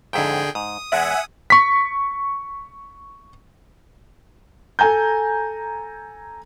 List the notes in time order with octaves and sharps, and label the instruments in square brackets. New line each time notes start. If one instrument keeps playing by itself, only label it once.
[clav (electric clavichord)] F2 G#2 E4 [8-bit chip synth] D3 G#4 G5
[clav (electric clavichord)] G#2 [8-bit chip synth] D#6
[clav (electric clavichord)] E2 G#3 D5 [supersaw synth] E5 F#5 G#5
[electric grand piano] C#6 B6
[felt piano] A4 G#5 A#5 G6